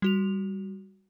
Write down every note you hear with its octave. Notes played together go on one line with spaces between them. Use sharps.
G3 F#4 F7